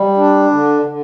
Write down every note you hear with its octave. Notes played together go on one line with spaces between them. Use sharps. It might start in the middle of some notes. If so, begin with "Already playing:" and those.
Already playing: G3
D4
D3
D3